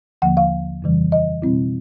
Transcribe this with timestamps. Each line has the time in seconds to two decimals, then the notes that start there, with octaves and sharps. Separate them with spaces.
0.22 D#2 D3 F3 A#3 F#5
0.37 F5
0.82 F2 C#3 E3 G3
1.12 D#5
1.42 B2 G3 C4 E4